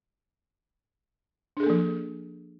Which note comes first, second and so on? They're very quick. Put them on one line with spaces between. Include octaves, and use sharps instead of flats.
D4 G#4 A4 A#3 F3